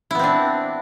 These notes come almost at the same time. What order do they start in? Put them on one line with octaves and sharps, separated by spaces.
E4 B3 C4 D4